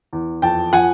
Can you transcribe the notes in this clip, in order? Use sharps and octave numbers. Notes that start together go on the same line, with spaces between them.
E2
F2 G5 A5
F3 F#5 G#5